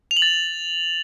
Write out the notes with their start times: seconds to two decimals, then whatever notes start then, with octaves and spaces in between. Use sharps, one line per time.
0.11 F7
0.17 F#7
0.22 A6